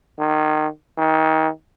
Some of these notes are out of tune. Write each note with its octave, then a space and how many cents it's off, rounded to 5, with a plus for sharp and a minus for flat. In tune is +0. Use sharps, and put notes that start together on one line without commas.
D#3 -20
D#3 +30